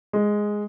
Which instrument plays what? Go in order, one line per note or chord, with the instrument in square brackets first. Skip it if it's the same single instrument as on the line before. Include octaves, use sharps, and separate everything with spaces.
[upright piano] G#3